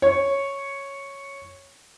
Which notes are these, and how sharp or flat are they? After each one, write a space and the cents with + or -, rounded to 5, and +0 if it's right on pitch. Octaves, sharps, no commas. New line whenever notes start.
C#5 -5